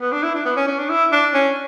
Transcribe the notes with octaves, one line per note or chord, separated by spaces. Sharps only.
B3
D4
E4
D4
B3
C#4
C#4
D4
E4
D4
C#4